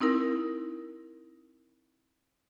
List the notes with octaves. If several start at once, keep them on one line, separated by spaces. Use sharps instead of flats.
C4 D#4 E4 A#4